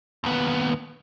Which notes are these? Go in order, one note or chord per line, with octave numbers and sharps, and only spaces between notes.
D#2 B3